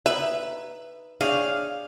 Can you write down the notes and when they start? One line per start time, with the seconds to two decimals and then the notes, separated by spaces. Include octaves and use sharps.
0.06 D#4 B4 E5
1.21 D4 G#4 C#5 F5 G5